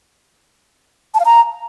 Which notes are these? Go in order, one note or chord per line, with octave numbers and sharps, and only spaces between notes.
A5
F5
A#5